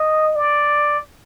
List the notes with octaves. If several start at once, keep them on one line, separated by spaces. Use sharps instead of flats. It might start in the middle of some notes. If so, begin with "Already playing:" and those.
Already playing: D#5
D5